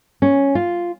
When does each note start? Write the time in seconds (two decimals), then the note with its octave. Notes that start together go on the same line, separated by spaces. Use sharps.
0.22 C#4
0.55 F4